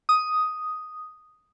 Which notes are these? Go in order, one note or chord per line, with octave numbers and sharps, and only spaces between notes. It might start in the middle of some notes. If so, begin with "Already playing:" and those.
D#6